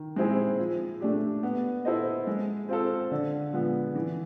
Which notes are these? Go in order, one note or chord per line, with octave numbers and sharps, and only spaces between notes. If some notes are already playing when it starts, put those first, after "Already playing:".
Already playing: D#3
G#3 C4 E4 G#4
F3
A3 D4 G4
B3
E4 A4 C5 D#5
G#3
C4 F4 A4
D3
F3 G#3 B3
E3